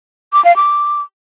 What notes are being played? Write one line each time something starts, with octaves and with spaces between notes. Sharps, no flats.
D6
F5
D6